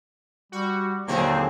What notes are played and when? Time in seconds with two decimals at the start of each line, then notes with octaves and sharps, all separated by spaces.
0.52 G3 F#4
1.08 D#2 A#2 D3 F#3 C4 G#4